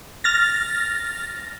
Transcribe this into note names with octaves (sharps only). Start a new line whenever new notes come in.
F6 A6 A#6